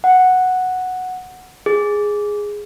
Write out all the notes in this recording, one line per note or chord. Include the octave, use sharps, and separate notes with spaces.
F#5
G#4